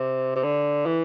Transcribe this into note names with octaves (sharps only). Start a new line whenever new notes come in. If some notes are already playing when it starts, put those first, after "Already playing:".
Already playing: C3
C3
D3
E3